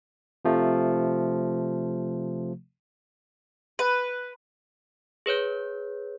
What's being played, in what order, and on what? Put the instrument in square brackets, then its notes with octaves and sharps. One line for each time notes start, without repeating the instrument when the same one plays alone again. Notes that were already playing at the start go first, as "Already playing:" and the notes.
[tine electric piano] C3 F3 A3
[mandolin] B4
[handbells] G#4 B4 C#5 G6